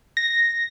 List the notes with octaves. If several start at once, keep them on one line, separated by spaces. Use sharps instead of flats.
A#6